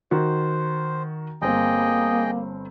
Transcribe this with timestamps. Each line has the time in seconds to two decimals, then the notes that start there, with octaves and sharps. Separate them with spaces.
0.11 D#3 F#4 C5
1.42 G1 A#3 C4 G#4 D#5 G5